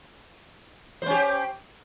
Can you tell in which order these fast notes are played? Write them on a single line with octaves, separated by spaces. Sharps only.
C5 C#4 G4